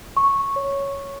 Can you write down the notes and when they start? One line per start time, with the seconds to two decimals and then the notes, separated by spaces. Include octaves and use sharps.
0.17 C#6
0.56 C#5